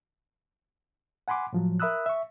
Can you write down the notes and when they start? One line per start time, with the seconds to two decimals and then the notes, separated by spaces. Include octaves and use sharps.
1.28 F#5 G#5 B5 C6 D6
1.53 A2 F3 F#3
1.80 A#4 E5 B5 D#6 E6 F#6
2.06 E5 C#6